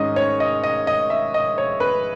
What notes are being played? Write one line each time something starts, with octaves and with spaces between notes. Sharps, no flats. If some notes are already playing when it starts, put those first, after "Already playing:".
Already playing: G#2 D#3 G#3 C#4 D#5
C#5
D#5
D#5
D#5
E5
D#5
C#5
B4